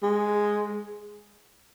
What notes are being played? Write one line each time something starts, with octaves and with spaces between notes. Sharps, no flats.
G#3